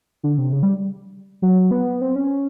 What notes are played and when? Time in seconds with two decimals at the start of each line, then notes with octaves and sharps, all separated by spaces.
0.23 D3
0.38 C3
0.53 C#3
0.63 G3
1.42 F#3
1.71 B3
2.01 C4
2.16 C#4